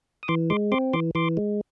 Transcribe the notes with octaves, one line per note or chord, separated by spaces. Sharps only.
D#6
E3 C6 D6
G#3 C6 D6
C4 C6 D6
E3 C6 D6
E3 C6 D6
G#3